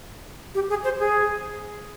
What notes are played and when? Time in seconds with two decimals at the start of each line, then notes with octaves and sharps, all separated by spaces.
0.55 G4
0.69 G#4
0.84 C5
0.98 G#4